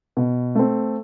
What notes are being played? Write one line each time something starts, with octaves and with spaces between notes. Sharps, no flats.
B2
A3 C4